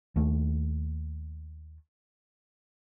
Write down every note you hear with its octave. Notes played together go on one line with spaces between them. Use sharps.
D#2 A3